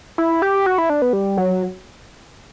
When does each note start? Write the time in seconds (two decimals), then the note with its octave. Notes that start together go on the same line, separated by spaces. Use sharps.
0.18 E4
0.42 G4
0.66 F#4
0.78 E4
0.90 D4
1.02 B3
1.13 G3
1.37 F#3